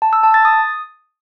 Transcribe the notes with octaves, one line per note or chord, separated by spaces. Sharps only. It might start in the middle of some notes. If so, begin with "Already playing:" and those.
A5
E6
A5
A6
D#6